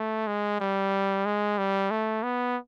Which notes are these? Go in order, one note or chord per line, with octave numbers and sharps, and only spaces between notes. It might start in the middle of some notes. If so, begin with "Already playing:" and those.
Already playing: A3
G#3
G3
G#3
G3
A3
B3